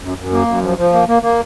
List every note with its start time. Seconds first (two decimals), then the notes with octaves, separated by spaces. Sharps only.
0.03 F#2
0.18 F#2
0.32 A#3
0.48 F#2
0.63 F3
0.77 F3
0.93 A#3
1.08 A#3
1.23 A#3